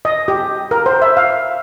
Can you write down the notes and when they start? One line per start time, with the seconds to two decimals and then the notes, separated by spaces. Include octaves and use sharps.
0.05 D#5
0.28 G4
0.71 A#4
0.86 C5
1.02 E5
1.17 F5